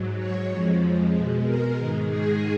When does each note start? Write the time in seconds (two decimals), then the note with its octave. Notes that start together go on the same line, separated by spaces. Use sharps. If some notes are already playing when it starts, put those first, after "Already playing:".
Already playing: G#2 F#3
0.18 C#5
0.49 F2 F3 G#3
1.13 B2 G#3
1.45 A#4
1.76 G#2 D#3 G#3
2.09 G#4